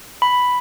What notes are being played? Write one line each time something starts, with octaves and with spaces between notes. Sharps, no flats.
B5